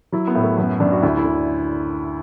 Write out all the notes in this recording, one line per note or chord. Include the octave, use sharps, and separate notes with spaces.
F#3 E4
B3
A2
A3
F#2 B3
F#2 D4
F#4
D2 E4
E4
D3